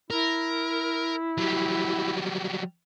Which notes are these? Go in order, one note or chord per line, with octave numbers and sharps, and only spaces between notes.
E4 A#4
F#3 G3